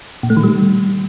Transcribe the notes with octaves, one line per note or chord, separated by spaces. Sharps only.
A#2
A3
D#3
G3